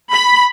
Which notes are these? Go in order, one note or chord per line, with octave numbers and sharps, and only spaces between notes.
B5